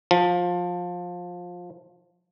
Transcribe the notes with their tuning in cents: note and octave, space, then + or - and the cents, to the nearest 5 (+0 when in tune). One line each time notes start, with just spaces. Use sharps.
F3 +20